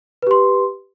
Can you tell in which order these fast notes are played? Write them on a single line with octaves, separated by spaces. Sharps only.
B4 G4 C6